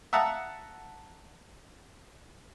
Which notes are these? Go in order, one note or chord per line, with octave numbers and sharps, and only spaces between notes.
E5 F#5 A5 A#5 D#6 F#6